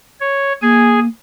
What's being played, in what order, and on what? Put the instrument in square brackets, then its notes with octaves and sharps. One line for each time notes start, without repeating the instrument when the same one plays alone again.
[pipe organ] C#5
[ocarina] A#3 [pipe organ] G#4 G#5